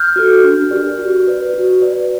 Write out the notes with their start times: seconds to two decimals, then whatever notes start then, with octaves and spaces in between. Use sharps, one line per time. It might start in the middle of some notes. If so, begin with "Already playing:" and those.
Already playing: F6 G6
0.16 F#4 A4
0.44 D4
0.71 G4 A#4 D5
0.99 F#4
1.27 B4 D5
1.54 F#4
1.81 B4 D5